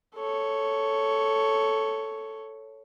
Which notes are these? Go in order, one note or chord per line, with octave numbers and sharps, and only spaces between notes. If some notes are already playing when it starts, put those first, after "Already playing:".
A4 C#5